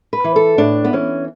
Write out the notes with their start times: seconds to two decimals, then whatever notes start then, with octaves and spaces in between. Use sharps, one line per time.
0.13 B4
0.24 E3
0.36 A4
0.58 A2 D4
0.84 B3
0.93 E3 C#4